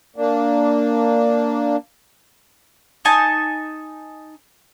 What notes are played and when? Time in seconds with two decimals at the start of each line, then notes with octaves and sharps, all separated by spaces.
0.16 A#3 D4
3.05 D#4 G#5 A5